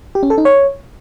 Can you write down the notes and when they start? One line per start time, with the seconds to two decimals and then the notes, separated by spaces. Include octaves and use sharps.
0.15 G4
0.23 C#4
0.30 A4
0.38 D#4
0.45 C#5